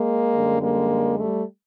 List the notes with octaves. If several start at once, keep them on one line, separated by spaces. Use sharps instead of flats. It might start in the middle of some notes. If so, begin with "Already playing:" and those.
Already playing: G#3 A#3
F#2 D3 G3
G#3 A#3
G3 A3